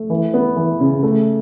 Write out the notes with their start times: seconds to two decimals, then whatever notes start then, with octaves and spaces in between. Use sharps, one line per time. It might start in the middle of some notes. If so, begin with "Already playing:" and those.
Already playing: A3
0.10 E3
0.34 B3
0.56 E3
0.80 C#3
1.03 A3